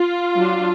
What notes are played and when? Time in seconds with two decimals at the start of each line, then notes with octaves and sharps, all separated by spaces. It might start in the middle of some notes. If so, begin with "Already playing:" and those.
Already playing: F4
0.36 F#3 D4